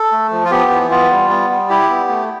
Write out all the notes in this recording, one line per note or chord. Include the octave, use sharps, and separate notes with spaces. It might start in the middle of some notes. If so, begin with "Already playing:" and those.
Already playing: A4
A3
F3
F4
B3 G4
E3
B3 F4
G3
B3
G3
E4 G4
B3
A3